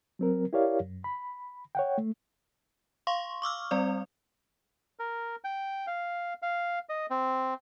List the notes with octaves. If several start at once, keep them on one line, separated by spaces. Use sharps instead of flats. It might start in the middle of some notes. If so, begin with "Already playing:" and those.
F#3 C4 A#4
E4 G4 A#4 C#5 D5 F5
F#2
B5
C#5 F#5 G5
A3
F5 C6 C#6
C#6 D6 E6 F6
G3 C4 D5
A#4
G5
F5
F5
D#5
C4